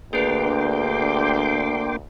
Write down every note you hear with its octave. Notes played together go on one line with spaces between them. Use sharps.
D2 A#3 D4 G#4 B4 G5 C6 D6